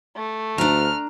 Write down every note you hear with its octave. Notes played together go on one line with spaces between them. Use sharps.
A3
D2 D4 A#5 F6